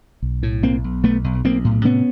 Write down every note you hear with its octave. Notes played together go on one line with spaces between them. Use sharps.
B1
A2
B1 A#3 C4
B1
B1 A3 B3
B1
B1 A#3 C4
A2
C3 B3 C#4